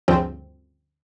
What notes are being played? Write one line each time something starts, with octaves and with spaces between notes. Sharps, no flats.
D2 G2 C#3 F3 C4